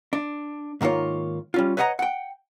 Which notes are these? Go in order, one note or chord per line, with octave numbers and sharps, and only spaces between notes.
D4
G#2 D#3 A#3 F4 C#5
G3 C#4 F4
B4 C#5 D#5 F#5 G5 A#5
F#5 G5